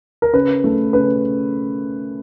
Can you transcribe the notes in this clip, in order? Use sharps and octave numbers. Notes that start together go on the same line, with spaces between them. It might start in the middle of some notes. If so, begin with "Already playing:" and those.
A#4
C#3 B4
A3
C#3 B4